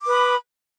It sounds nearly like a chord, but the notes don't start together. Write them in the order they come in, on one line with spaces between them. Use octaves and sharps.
D6 B4 D#6 B5